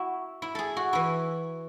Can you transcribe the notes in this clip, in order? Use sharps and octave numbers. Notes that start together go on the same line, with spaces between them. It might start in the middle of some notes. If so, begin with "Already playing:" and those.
Already playing: E4 F#4
E4
G#4 A4
F#4
E3 E4